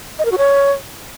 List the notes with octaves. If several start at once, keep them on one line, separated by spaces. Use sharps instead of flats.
D#5
A#4
F#4
C#5